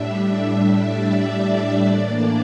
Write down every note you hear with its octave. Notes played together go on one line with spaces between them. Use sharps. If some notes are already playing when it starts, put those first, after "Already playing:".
Already playing: A2 G3 D4 E5
D5
A2 E3 A#3 D4